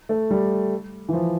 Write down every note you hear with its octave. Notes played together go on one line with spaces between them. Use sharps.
A3
G3
E3
F3